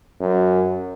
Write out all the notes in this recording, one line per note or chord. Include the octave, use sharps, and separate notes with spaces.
F#2